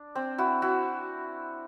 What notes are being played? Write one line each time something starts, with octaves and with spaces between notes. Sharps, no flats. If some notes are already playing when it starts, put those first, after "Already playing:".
Already playing: D4
C4
E4 F#4
E4 F#4